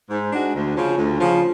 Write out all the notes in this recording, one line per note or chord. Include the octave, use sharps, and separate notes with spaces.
G#2
G#3 D4 F#4
D2
C#3 F3
D2
C#3 F3